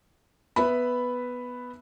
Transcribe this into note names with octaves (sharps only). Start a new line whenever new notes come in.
B3 B4 E5 B5